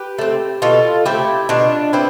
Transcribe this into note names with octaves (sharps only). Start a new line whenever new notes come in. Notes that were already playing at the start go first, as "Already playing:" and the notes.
Already playing: G4 B4
A3 C4
B2 F4 A4
A3 C4 E4 G4
B2 D4 F4
B3 C4 E4